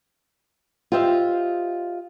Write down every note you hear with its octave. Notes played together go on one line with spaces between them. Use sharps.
F4 G4 C5 D#5 E5